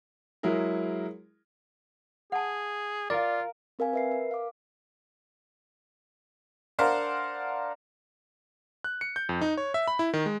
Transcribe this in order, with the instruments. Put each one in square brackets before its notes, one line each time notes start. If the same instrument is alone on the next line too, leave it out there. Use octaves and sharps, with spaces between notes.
[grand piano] F#3 G#3 E4 G#4 A#4
[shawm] G#4 [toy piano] F#5 A5
[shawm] F4 [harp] A#4 F5 [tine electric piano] D5
[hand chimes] C4 A#4 F5 G#5
B4 E5 C7
A#4
F5 D6
[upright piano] D4 A#4 C5 F5 F#5
[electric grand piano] F#6
C#7
G6
F2
D#4
C#5
E5
B5
E4
D#3
G#3